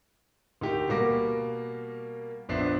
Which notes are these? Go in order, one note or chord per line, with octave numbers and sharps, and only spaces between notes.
D2 D#4 G4 A#4
B2 G3 A#3 F#5 D6 A#6
A#1 F2 B3 D4 E5 C7